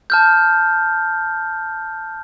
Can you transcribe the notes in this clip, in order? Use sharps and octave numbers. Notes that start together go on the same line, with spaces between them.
A5 F6 G6